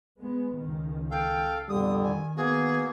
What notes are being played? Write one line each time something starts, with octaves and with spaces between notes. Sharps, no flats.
G#3 B3
C#2 D#3
A4 F5 G5
F2 B2 D3 G3 D#6
D#3 G#5
A#3 B3 F#4 G#4